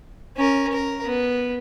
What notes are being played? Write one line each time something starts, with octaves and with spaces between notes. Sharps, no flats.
C#4 A#4
A#4
B3